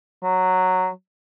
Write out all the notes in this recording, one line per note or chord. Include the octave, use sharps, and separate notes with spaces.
F#3